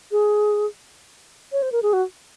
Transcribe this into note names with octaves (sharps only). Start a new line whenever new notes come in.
G#4
C#5
C5
A#4
G#4
F#4